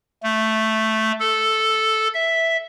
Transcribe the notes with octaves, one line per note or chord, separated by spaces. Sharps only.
A3
A4
E5